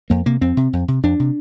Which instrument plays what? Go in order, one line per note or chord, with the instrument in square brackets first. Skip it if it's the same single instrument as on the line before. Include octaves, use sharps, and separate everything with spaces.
[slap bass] F2 A#3
C3 A#3
F2 C4
C3
F2
C3
F2 D4
C3